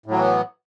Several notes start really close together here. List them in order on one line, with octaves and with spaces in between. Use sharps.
A2 F#3 E3 B3